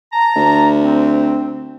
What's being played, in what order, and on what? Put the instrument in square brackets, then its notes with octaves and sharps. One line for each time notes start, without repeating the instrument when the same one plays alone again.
[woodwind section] A5 A#5
[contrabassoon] D2
[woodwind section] C4